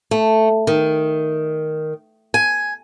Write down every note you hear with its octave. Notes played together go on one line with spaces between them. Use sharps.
A3
D#3
G#5